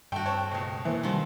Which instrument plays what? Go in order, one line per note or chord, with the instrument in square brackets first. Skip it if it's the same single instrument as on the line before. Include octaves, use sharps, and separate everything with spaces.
[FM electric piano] G2 [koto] A3 F#4 [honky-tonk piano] G5
[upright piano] C4 C#5 A5
C#2 B2
[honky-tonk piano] E3 [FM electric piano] A#3 C5 E5
[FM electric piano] C3 G3 E6 [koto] D#3 F3